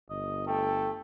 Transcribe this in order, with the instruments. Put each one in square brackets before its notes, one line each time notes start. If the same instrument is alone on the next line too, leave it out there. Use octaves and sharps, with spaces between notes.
[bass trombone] G1 [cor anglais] D#5
[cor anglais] A3 [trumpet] A4 [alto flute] G5